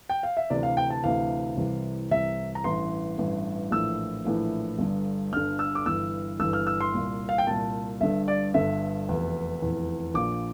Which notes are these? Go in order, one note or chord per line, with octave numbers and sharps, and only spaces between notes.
G5
F5
E5
D2 C3 E3 D5
F5
G5
A5
D2 C3 E3 F5
C2 C3 E3
C2 C3 E3 E5
A#5
A1 G2 E3 C6
A1 G2 E3
A#1 A2 E3 E6
A#1 A2 E3
G1 G2 D3
G1 G2 D3 F6
E6
D6
G1 G2 E3 E6
G1 G2 E3 E6
F6
E6
C6
C2 A#2
F5
G5
C2 A#2 A5
G1 G2 D3 E5
D5
G1 G2 D3 E5
F1 E2 E3
F1 E2 E3
A#1 A#2 D6